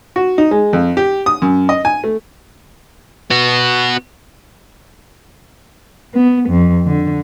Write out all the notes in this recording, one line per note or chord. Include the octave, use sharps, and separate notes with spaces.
F#4
D#4
G#3
F2
G4
D#6
F#2
D#5
G#5
A3
B3 F#4
B3
F2
D3